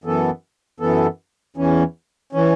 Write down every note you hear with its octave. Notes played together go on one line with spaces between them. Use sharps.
F#2 E3 B3 A4
F#2 E3 B3 A4
E2 E3 C#4
E3 C#4